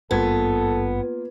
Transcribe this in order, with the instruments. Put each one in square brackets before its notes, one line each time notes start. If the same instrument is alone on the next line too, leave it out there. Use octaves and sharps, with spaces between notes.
[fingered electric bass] G#1 G2 G3 [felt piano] A#3 F4 G#6 [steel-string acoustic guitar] B3 [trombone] A4